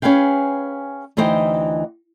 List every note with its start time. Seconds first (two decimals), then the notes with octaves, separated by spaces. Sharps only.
0.02 C#4 G#4 B4 F5 G5
1.17 D2 E3 D#4 C5 D#5 G5